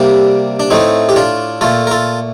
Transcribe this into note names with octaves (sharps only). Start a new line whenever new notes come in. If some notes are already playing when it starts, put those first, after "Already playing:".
Already playing: C3 G3 A#3 D4
D4
A2 A3 C4 D#4
G4
D4 F4
A#2 A3 F4 A4
A#4
F4 A4